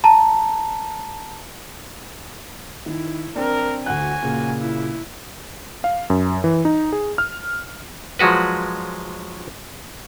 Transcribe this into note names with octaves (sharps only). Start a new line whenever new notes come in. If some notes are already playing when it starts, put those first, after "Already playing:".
A5 A#5
D#3 E4
C4 D4 A#4
D2 F#4 F#5 G#5 F#6
A#2 C#3 A#3
E4
F5
F#2
E3
D#4
G#4
F6
F3 F#3 G#3 F#4 B4